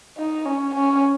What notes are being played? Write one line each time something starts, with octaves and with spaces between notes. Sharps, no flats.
D#4
C#4
C#4